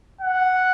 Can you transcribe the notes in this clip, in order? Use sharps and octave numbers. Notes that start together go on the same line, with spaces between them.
F#5